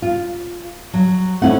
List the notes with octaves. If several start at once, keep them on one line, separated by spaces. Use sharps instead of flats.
F4
F#3
A3 C4 C#4 E4 F#5